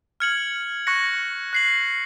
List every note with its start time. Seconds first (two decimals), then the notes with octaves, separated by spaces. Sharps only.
0.20 F6 G#6 C#7 F#7
0.87 C#6 F#6 A#6 C#7
1.53 F#6 C7 F#7